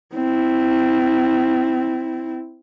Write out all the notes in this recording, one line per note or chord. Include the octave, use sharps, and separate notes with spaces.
C4 E4